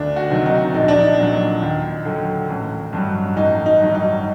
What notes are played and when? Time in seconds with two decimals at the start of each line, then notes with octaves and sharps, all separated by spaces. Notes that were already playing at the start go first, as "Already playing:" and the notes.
Already playing: D2 D4
0.16 F#4
0.30 C3 D#3 F#3
0.46 D#4
0.74 A#1 D#4
0.88 D4
1.01 D#4
1.18 A#2 F#3
1.62 D#2
2.05 D3 F#3
2.50 A1
2.93 G2 F#3
3.36 A1 D#4
3.66 D#4
3.80 G2 D#3 F#3
3.95 D#4